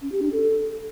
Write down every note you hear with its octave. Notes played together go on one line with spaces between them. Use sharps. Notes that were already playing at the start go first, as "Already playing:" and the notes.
C#4
G4
D4
A4